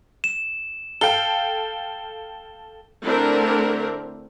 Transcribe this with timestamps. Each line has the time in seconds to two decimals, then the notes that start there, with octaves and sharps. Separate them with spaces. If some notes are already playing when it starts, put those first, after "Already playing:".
0.24 E7
1.01 A4 F5 G5 G7
3.05 D3 A3 C4 D4 E4 A#4